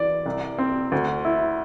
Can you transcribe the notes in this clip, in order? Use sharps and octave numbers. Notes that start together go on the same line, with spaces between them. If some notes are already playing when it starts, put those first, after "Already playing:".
Already playing: E3 D5
C2
C4
D2
E4